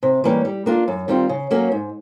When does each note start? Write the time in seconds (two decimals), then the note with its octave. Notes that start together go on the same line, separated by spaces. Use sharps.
0.03 C3
0.24 E3 G3 A#3 C#4
0.45 G3
0.66 A#3 D4 F4
0.88 F#2
1.08 D#3 G3 C4 F4
1.29 C#3
1.51 F#3 A#3 C#4 F#4
1.72 G#2